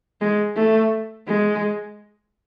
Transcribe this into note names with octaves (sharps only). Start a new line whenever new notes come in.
G#3
A3
G#3